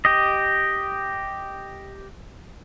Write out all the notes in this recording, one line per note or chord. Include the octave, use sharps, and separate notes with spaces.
G4 D#5